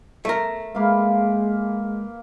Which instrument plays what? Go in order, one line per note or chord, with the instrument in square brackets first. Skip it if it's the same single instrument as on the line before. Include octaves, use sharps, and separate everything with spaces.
[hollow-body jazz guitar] A3 A#4
[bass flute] G#3 [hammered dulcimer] A#3 B4 F5